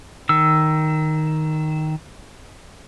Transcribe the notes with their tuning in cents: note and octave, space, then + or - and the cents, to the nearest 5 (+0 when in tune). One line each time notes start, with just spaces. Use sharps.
D#3 +0 E6 +0